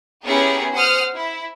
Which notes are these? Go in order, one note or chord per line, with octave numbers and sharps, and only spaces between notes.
B3 C#4 E4 G4 G#4 A#4
C5 F#5 D#6 F6 F#6
E4